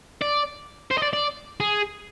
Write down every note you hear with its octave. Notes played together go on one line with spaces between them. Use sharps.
D5
C5
D#5
D5
D5
G#4